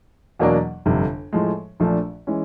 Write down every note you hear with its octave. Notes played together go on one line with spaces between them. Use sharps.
E2 B2 F#3 A#3 D4
G1 F2 C3
A2 F3 G#3
A#1 A#2 F3 A3 D4
E3 G#3 C#4